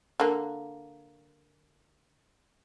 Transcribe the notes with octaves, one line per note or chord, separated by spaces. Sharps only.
D3 A#3